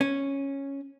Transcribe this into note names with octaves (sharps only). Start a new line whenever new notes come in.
C#4